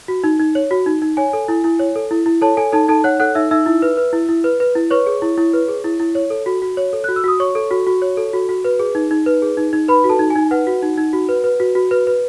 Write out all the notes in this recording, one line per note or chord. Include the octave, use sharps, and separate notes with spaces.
F#4
D#4
D#4
C#5
F#4
D#4
D#4
C#5 G#5
A4
E4
E4
C#5
A4
E4
E4
A4 C#5 A5
A4 G#5
D#4 A4 A5
D#4 A4 A5
C#5 F#5 F#6
A4 F#5 F#6
D#4 E5 E6
D#4 E5 E6
E4
B4
B4
E4
E4
B4
B4
E4
B4 C#5 C#6
G#4
E4
E4
B4
G#4
E4
E4
C#5
A4
F#4
F#4
C#5
A4
F#4 F#6
E6
F#4 D#6
C#5 C#6
A4
F#4
F#4
C#5
A4
F#4
F#4
B4
G#4
D#4
D#4
B4
G#4
D#4
D#4
B4 B5
F#4
A4 A5
D#4
G#5
D#4
B4 F#5
F#4
D#4
D#4
F#4
B4
B4
F#4
F#4
B4
B4